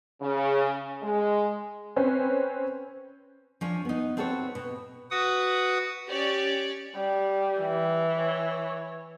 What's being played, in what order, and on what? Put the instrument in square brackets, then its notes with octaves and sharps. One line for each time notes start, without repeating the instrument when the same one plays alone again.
[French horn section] C#3
G#3
[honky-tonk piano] C4 C#4 B4
[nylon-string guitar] F3 C#4 D4
B3 D#4
C4 F#4 A4 B4 C#5
B2
[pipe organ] F#4 B4 F#5 D#6
[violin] C#4 G4 [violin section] C#5 D5
[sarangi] G3
[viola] E3
[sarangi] C#5